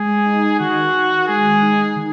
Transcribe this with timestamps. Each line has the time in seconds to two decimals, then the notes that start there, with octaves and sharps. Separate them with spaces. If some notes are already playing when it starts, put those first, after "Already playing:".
Already playing: G#3 G#4
0.25 D#4
0.60 D#3 F#4
0.94 D#3
1.27 G#3 G#4
1.62 D#4
1.96 D#3